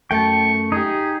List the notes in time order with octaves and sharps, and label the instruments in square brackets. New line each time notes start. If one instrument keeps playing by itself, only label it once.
[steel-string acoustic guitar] F#2 A3 [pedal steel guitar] G5 A5 [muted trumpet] C#6
[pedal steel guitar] D#4 G4 [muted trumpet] G#4